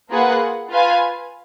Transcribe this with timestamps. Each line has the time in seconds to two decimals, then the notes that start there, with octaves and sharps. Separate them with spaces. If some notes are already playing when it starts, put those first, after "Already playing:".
0.10 A#3 F4 G#4 B4 F#5
0.70 F4 B4 F5 G#5